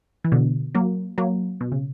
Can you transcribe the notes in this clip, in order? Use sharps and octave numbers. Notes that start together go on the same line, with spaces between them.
E3
B2 D3
F#3 A#3
F#3 A#3
B2
C#3